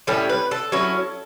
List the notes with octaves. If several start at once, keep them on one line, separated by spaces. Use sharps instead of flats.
A2 G3 C#4 E4 A4
B4
A4
F#3 C#4 E4